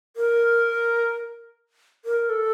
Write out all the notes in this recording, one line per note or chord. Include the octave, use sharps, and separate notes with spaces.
A#4
A#4
A4